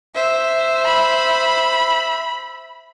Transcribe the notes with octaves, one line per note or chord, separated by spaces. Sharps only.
C5 E5
B5